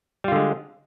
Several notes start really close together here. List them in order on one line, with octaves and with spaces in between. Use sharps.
G3 F4 D3 G#3